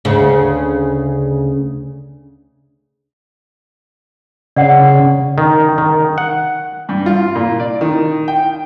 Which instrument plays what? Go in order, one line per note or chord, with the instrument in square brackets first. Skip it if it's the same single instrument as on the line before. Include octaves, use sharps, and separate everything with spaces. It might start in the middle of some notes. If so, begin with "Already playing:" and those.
[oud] D2 C#3
[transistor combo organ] C#3 [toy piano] D5 F#5
[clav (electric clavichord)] D#3
D#3
F#5
[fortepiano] G2
F4
A#2
D5
D#3
G5